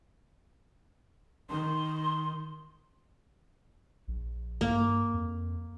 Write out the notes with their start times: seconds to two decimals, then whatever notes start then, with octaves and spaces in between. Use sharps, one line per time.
1.50 D#3 C6
4.08 A#1
4.61 G2 A#3
5.14 F2